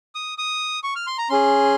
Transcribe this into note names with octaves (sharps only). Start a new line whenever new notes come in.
D#6
D#6
C#6
F6
C6
A#5
C#4 G#4 C6